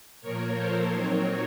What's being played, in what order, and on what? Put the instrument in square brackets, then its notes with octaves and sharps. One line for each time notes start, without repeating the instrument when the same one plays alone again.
[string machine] A#2 F3 A#3 A#4 C#5
A4 C5
A#2 F#3 C4 D#4 A#4 C#5